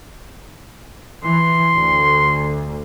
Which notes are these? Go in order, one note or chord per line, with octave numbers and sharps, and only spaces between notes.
E3 C6
D2